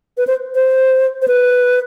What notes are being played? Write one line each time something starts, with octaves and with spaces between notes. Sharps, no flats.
B4
C5
C5
C5
B4